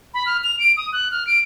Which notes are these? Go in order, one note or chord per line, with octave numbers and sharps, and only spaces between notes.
B5
F6
F7
D7
D#6
F#6
F6
D7